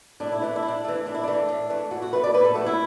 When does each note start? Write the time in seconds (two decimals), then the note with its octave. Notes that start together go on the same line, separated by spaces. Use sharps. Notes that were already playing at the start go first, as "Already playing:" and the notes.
0.20 A2 D4
0.32 E4
0.41 E3 A3 D4
0.56 E4
0.63 A2
0.68 D4
0.85 E3 A3
1.05 A2 D4
1.14 E4
1.24 E3 A3 D4
1.49 A2
1.70 E3 A3
1.91 A2 F#4
2.02 F#4
2.12 F#3 A3 B4
2.24 D5
2.34 A2 B4
2.45 A4
2.55 F#3 A3 F#4
2.66 E4